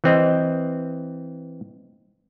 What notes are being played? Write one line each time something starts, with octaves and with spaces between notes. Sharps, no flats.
E3 C4 D#5